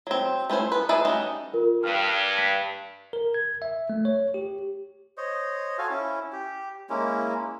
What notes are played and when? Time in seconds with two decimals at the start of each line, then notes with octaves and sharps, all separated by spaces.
0.07 F#3 C4
0.50 A3 C#4 E4 C5
0.72 B3 B4
0.89 G#4 B4 C5 D5 E5
1.05 G3 A3 C#4 D#4 F#4
1.53 F4 A#4
1.84 G2 F6 D#7
2.38 B6
3.13 A#4
3.34 G#6
3.62 E5
3.90 A3
4.05 C#5
4.34 G4
5.18 C5 C#5 D#5
5.78 F#4 A4 F5 G#5
5.90 C#4 E4
6.32 G4
6.90 G#3 A#3 C#4 E4